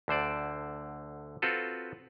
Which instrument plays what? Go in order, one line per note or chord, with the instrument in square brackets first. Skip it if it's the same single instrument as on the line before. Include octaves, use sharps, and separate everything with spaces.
[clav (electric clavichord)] D2 D3 C5 D5
C4 F4 F#4 A4 B4